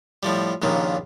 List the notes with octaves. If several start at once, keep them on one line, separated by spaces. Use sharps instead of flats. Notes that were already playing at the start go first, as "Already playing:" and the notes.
A2 F3 G3
A#1 D#2 A#2 C#3